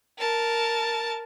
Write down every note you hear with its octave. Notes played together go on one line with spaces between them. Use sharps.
A#4 A5